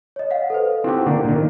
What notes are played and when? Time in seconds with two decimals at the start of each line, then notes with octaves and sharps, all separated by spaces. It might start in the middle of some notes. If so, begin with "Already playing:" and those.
0.16 C#5 D#5
0.31 F5 F#5
0.50 A4 B4 C5
0.84 C4 D#4 E4 F#4 G4
1.06 D3 A#3
1.24 A#2 D#3